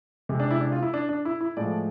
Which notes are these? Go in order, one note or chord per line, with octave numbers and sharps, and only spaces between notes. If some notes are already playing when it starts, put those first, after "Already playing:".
C3 G#3
D4
E4
D4
F4
E4
D4
D4
E4
E4
A2 F3 G#3 D5